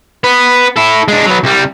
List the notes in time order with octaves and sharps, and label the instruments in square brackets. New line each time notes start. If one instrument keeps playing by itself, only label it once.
[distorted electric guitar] B3
E4 A4
G#3 D4
F#3 B3
C2 G3